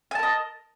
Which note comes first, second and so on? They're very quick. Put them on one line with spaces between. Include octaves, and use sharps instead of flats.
G#5 A5 A#4 D#5